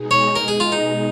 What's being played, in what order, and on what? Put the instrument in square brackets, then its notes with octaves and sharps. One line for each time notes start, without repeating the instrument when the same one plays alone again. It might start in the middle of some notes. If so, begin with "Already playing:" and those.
Already playing: [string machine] B2 G#3 D#4 G#4
[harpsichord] C#5
A#4
G#4
F4
D#4